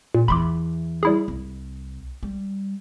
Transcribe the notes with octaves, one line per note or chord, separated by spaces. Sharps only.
A#2
E2 E3 B5 C6 D6
G3 E4 G#4
C2
G3